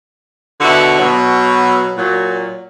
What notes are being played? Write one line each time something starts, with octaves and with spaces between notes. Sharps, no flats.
B2 D3 E4 F#4
B2 F#3
A#2 F#3